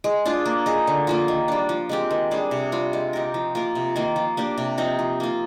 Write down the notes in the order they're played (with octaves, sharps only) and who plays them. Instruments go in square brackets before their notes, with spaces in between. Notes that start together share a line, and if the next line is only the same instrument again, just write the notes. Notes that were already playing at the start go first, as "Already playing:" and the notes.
[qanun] G#3
D4 F4 G#4
A#3
D#4 G#4
D3
F3 A#3 F4
D#3
G3 D4
F3
G#3 C4 G4
D#3
G3 D4 G#4
C3
G3 C4 F4
G#3
D#4 G4 A#4
F3
A#3 F4 A#4
C3
D#3 A#3 F4
F3
A#3 D4 G4
C3
F3 C4 D#4
F3
A#3 F4